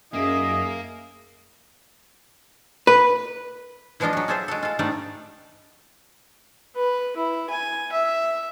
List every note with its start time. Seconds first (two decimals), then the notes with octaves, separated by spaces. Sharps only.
0.13 F#2 A#3 G#4 D#5 E5
2.87 B4
4.00 E3 F3 G#3 D4 F4 D#5
4.13 F#3 F#4
4.28 F4 G#4 A4 C5 E5
4.48 G#3 F#4 A4
4.63 F4 A4
4.79 G#2 G3 A3 D4 D#4 D5
6.75 B4
7.16 E4
7.50 G#5
7.92 E5